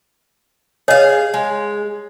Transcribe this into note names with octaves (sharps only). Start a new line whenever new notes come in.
G#4 C#5 D#5 F5
G#3